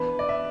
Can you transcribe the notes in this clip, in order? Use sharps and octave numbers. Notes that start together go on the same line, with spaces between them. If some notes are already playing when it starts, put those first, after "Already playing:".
Already playing: E3 B3 D4 B4
D5
E5